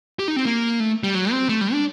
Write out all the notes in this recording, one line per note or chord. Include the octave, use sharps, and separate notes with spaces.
G4
D#4
C4
A#3
A3
G3
F#3
C4
A3
G3
D4